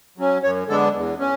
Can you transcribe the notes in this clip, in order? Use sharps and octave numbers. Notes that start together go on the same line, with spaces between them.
F#3 C#4
F#2 C#5
D3 G#3 B3 D4 A4
E2
C#4